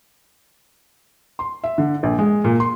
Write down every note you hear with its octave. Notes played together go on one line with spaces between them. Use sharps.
C6
E5
D3
A#1
G#3
A#2
C6